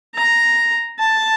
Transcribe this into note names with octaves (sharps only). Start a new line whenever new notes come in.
A#5
A5